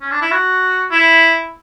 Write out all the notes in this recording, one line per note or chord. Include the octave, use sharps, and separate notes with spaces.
C#4
D4
E4
F#4
E4